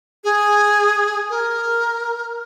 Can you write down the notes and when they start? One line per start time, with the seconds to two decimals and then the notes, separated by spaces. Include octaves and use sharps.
0.24 G#4
1.30 A#4